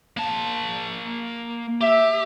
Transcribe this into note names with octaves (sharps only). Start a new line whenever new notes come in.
A#3 A5
G4 E5